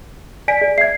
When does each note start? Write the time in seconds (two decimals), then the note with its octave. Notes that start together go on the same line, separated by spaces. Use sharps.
0.48 D5 G#5 B6 D7
0.61 G#4 D5
0.78 E5 G#6 C7